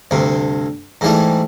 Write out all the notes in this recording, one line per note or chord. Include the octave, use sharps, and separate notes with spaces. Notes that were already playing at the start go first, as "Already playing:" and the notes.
D2 G2 C3
G#2 E3 G3 A3